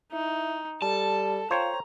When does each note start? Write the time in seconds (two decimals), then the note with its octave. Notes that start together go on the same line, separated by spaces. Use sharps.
0.12 D#4 E4
0.82 G3 A4 A5
1.51 F4 C5 C#5 G5 A#5